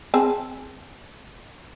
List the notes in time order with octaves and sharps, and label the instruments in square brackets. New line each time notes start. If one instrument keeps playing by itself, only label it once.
[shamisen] C4 G#4 A5